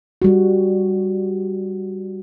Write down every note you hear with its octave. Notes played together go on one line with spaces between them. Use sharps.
G3 F#4